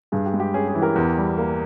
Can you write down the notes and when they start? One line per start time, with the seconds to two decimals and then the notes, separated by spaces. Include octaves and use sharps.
0.12 G2 G#4
0.26 G4
0.33 G#3
0.40 G4
0.54 C#4 G#4
0.68 G#4
0.75 E3
0.82 G4 A#4
0.96 E2
1.17 G3
1.38 A#3